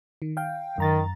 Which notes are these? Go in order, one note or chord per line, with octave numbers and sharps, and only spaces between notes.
D#3
F5 G5
F#2 D#3 A#5 A6